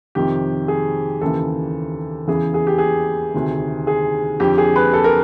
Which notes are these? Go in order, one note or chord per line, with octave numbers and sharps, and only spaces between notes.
F2 C3 D#3 G4
G#4
D#2 C#3 E3 A4
E2 C#3 E3 G#4
G#4
G4
G#4
D2 C3 D#3
G#4
F2 D3 G4
G#4
B4
A4
A#4